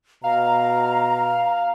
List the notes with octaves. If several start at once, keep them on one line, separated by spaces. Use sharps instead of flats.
B2 F5 A#5